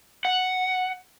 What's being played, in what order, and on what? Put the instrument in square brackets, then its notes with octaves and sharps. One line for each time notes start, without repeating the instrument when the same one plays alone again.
[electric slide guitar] F#5